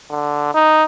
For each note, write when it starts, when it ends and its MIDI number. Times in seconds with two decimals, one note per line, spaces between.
0.10 0.53 50
0.54 0.84 63